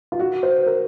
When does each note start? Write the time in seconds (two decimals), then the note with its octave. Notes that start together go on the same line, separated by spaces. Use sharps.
0.12 F4
0.19 F#4
0.43 C5
0.66 A#4